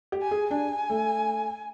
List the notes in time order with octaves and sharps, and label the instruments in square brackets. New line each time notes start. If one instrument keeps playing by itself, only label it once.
[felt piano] G4
[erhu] G#5
[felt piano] G#4
[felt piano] D4 [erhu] G#5
[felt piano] A3